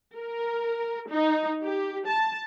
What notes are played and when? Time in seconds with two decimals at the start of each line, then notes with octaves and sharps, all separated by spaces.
0.16 A#4
1.08 D#4
1.63 G4
2.07 A5